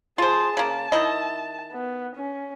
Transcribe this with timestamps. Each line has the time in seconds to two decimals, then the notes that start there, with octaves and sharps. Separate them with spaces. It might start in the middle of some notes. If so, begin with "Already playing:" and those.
0.18 F4 G#4 C5 A5
0.57 C#3 A#3 A5
0.92 D#3 E4 D#5
1.72 B3
2.15 C#4